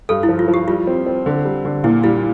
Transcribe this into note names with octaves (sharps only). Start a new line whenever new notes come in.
G2 A4
E4
F3
F4
F3
G4
G3 F4
C4
C4
D3
G3
D3
A#2 E4
G3 E4